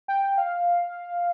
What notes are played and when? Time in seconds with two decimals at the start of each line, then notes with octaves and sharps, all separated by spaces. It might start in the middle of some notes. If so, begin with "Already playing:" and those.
0.08 G5
0.23 G5
0.38 F5